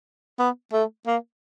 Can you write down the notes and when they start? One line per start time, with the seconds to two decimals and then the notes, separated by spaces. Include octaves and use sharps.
0.39 B3
0.73 A3
1.07 A#3